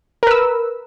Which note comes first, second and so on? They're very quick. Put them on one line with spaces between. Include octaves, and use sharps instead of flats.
A#4 B4 E6